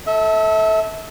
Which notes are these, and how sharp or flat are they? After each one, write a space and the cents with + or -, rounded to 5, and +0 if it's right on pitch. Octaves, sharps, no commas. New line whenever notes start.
A4 +0 E5 -30